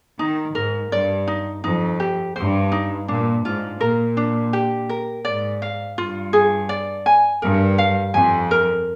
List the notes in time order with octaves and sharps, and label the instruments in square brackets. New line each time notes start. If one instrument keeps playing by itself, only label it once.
[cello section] D#3 [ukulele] D#4
[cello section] G#2 [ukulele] A#4
[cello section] G2 [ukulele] D5
[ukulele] D#4
[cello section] F2 [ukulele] D#4
[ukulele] G4
[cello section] G2 [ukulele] C5
[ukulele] D#4
[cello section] A#2 [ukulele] D4
[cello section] G#2 [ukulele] F4
[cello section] A#2 [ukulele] A#4
[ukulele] D4
G4
A#4
[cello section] G#2 [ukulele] D5
[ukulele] F5
[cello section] G2 [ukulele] F4
[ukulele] G#4
D5
G#5
[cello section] G2 [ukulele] A#4
[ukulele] F5
[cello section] F2 [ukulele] G#5
[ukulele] A#4